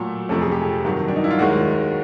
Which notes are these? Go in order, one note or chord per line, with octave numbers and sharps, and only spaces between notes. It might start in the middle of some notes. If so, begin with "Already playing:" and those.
Already playing: A#2 F#3 A3 A4
F2 C3 F3 A3 C4 A4
G#4
G4
G#4
G2 D#3 F#3
D4
D#4
E4
F4
D#2 D#3 G#3 F#4